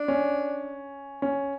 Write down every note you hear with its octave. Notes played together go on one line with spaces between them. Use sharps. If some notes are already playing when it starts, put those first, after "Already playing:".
Already playing: D4
C#4
C#4